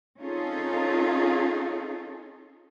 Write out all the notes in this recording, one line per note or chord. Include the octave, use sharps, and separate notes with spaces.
C4 C#4 D#4 F4 G#4 A4